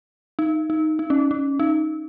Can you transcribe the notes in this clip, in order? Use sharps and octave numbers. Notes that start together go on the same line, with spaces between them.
D#4
D#4
D#4
C#4
C#4
D#4